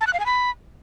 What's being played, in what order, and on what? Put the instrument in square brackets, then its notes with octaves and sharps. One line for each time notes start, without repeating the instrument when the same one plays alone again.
[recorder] A5
F#6
F5
G#5
B5